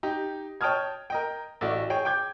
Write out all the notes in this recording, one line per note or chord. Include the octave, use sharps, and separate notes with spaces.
D#4 G4
C#5 G5 A5 D#6 F6 G#6
A#4 D#5 G5
A1 A3 F#4 D5
G#4 C#5 G5
G5 D6 G6 G#6